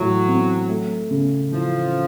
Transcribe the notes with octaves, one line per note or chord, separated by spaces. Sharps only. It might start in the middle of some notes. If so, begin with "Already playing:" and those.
Already playing: A2 E3 F#3 A3
C4
A3
C#3
E3 F3